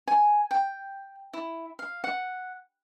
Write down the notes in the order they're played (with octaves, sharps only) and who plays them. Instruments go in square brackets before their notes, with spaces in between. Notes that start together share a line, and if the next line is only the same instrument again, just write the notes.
[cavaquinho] G#5
G5
E4
F5
F#5